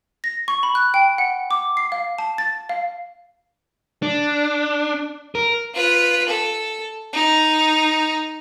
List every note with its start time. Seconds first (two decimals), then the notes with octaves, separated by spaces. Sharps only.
0.24 A#6
0.48 C#6
0.63 B5
0.75 F#6
0.94 G5
1.18 F#5
1.51 D6
1.77 C7
1.92 F5
2.18 A5
2.38 A6
2.69 F5
4.03 D4
5.35 A#4
5.74 F4 B4
6.29 A4
7.13 D#4